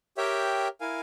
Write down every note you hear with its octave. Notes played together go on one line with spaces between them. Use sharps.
G4 A#4 C#5 E5 G5
E4 A#4 F5 G#5